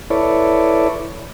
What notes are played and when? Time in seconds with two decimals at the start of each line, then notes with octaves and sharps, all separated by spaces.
0.10 E4 A4 B4 C#5 D5